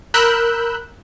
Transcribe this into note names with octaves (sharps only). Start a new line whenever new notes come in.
A#4 B5 E6 F#6 G6